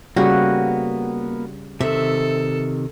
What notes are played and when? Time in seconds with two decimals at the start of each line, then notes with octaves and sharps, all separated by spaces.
0.17 C#3 G3 A#3 B3 F#4 G5
1.81 C3 D#3 A4 E5